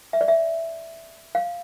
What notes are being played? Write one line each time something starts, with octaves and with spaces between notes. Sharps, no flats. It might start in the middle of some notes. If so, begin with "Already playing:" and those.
E5
D5
E5
F5